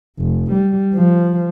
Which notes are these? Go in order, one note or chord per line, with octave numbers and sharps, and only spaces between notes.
F1
G3
F3